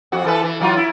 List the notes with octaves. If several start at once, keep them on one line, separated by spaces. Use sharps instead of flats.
F2 F#4
E3 A4 B4
E3
E3 F#3 F4
E4